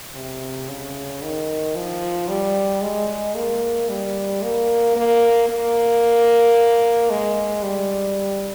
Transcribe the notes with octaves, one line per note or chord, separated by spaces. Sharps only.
C3
C#3
D#3
F3
G3
G#3
A#3
G3
A#3
A#3
A#3
G#3
G3